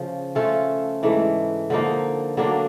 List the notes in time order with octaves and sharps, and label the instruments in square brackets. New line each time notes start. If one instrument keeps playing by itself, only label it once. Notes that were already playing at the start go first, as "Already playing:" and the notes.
Already playing: [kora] C#3 F3
A3 C#4 F4 A4
G#2 E3 A3
D3 F3 A#3 D#4
D3 F#3 A#3 D4